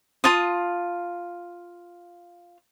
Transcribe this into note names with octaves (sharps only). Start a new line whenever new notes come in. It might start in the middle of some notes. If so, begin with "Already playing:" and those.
F4 A5 D#6